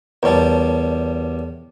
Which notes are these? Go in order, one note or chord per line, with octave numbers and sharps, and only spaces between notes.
E2 G3 A#4 C#5 A5